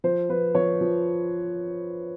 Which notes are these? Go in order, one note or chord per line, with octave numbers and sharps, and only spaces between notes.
F3 C5
F3 B4
F3 C#5
F3